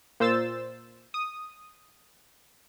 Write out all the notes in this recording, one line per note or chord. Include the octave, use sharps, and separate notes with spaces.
A#2 C5 E6 A6 E7
D#6